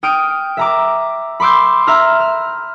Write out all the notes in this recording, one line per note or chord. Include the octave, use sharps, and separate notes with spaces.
G5 D#6 F6 D7
E5 A#5 D6
B5 C6 D6 E6 G6
E5 A#5 E6 F6
F6